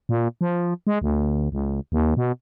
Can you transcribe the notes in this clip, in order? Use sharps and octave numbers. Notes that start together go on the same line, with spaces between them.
A#2
F3
G#3
D2
C#2
D#2
B2